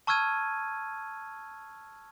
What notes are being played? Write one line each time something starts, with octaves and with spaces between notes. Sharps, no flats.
A5 C#6 E6 F6 G#6 D#7